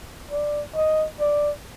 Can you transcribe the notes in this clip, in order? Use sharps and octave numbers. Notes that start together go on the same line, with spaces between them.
D5
D#5
D5